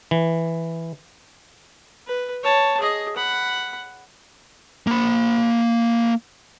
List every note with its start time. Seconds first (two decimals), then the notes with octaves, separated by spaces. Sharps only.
0.11 E3
2.07 B4
2.44 C#5 A5
2.80 G#4 D#5
3.16 F#5 B5
4.87 A#3 B5